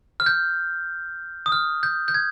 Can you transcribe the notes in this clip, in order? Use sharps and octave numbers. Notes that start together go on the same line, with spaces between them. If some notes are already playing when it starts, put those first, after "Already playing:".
F6
G6
D#6
F6
G6
G6
G#6